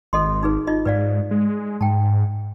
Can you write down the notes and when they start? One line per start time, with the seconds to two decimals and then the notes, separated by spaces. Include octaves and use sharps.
0.13 G#1 A4 D#5 C6
0.43 D#4 G#4 B4
0.67 D#4 F4 D#5
0.86 G#2 B4 D5 F5
1.31 G#3
1.81 G#2 G5 A5